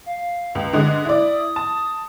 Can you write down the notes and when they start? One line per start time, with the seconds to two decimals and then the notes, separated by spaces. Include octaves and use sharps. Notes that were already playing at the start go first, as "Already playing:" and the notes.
0.06 F5
0.55 C#2
0.73 D3 G#3 D#6
1.05 E4 D5
1.56 A5